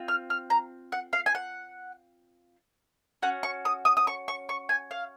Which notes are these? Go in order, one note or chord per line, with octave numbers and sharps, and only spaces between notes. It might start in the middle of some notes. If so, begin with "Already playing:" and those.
Already playing: C4 F4
F6
F6
A#5
F#5
F5
G#5
F#5
C#4 F#4 F#5
C#6
D#6
D#6
D#6
C#6
C#6
C#6
G#5
F5